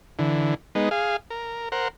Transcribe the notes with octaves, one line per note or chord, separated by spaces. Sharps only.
D3 E3
G#3 B3 D#4
G#4 F5
A#4
A#4 C5 F#5